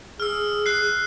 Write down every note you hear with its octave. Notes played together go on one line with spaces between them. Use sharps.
G#4 E6 F6
F#6 C7